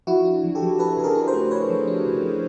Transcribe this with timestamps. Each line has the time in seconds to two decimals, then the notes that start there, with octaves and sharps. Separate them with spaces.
0.07 F3 E4 F#4
0.25 D4
0.44 F3
0.55 G4 A4
0.62 F3
0.79 D4 A4 B4
0.97 C#3 A4
1.04 G#4 A#4
1.15 D4
1.28 A#4 C5
1.34 A3
1.51 D4 B4 C#5
1.70 F3
1.87 D4
2.06 C#3
2.23 F3